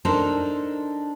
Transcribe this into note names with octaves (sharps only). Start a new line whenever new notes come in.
D4 D#4 A4 A#4 C5